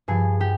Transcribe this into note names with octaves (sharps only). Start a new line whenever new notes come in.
G2 F3 G#4
G4